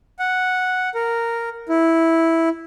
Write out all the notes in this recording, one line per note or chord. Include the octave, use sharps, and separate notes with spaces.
F#5
A#4
E4